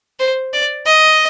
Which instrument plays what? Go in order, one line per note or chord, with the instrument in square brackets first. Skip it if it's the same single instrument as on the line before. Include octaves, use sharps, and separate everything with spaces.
[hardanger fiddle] C5
D5
D#5